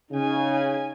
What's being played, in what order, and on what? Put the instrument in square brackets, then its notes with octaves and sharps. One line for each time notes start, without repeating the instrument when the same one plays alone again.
[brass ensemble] C#3 [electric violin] D#4 G#5